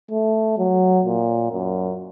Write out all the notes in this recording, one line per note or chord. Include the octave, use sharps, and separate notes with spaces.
A3
F#3
A#2
F#2